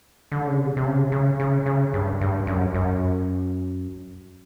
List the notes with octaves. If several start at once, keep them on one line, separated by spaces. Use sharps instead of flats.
D3
C#3
C3
C3
C#3
C#3
C#3
C#3
G2
G2
F#2
F#2